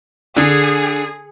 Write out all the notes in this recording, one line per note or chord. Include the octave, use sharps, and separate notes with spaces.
D3 G#4